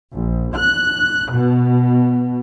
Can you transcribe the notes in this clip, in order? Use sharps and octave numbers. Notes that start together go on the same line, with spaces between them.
A#1
F#6
B2